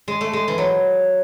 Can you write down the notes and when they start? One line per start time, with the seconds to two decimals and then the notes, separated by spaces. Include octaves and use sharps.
0.08 G#3
0.21 A3
0.33 G#3
0.48 E3
0.58 F#3